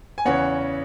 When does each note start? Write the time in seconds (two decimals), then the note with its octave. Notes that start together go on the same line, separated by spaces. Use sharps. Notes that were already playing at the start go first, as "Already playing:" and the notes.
0.18 G#5
0.25 E2 C#3 E3 C#5 F#5